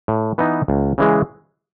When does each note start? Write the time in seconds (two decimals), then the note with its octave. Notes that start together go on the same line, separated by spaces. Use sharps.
0.08 A2
0.38 E3 B3 D#4
0.68 C#2
0.98 C#3 E3 G#3